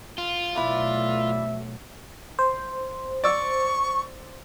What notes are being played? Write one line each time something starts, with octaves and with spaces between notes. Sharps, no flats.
F4
B2 F#3 A3 E4 B4 D5 E5
C5
D5 C#6 E6